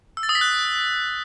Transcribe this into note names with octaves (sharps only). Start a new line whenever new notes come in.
E6
A6
D#6
B6
F#6